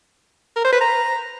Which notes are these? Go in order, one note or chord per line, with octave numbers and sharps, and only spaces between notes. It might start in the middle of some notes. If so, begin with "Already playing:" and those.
A#4
C5
B4
A#5